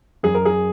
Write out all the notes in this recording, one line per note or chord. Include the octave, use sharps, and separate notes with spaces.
F#2 G#4
A#4
G#4